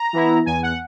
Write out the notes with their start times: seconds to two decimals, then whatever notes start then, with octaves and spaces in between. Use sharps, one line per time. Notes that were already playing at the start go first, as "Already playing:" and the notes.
Already playing: A#5
0.13 E3 B3 E4
0.46 E2 G#5
0.63 F#5